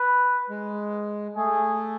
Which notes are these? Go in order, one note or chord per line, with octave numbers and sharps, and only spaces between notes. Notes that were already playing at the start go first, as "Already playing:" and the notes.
Already playing: B4
G#3
A3 G#4